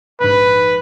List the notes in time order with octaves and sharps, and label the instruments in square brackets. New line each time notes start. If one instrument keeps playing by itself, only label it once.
[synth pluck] A#1 G#2 [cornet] B4